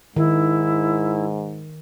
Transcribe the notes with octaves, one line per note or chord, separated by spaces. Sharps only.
G#2 D#3 E4